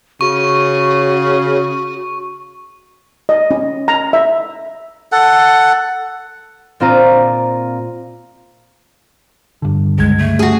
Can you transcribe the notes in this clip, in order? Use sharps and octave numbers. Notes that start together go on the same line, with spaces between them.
C#3 F#4 C#6
D#5
C#4
A#5
E5
A4 F#5
A#2 C4 F4 D5 A#5 D#7
G2 D3
C#2 G#3 G#6
A3
F#4 G#4